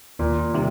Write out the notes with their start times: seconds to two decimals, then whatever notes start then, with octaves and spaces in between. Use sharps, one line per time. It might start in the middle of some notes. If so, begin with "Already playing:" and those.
0.19 D#2 A#2
0.54 C3 D#3 G3